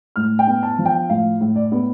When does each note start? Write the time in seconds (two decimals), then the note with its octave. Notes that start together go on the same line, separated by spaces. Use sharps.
0.16 A2 F6
0.39 G5
0.47 B3
0.63 A5
0.79 F3
0.86 G5
1.10 A2 F5
1.41 A2
1.56 D5
1.72 B3